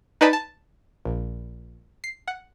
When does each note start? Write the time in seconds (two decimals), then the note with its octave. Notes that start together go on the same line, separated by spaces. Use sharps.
0.21 D#4 B4 D5 G#5 A5 B5
0.33 A5
1.05 A#1
2.04 C7
2.28 F#5